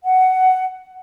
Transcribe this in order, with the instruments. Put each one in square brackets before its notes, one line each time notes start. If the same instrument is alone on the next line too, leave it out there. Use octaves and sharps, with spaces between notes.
[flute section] F#5